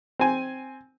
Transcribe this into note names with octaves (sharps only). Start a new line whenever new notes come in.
C4 G#5